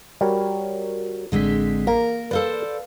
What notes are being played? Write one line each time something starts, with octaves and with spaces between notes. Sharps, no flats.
G3 F#4 A#4 C#5
A1 D3 G#3 C4 D4 B6
A#3 A#4
A4 B4 C5 D5 F5